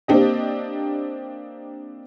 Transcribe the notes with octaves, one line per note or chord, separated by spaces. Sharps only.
A#3 C4 D4 G4 D#5